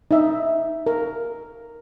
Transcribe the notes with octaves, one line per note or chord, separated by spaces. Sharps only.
D#4 E5
A#4